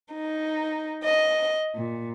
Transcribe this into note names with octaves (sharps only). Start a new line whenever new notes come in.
D#4
D#5
A#2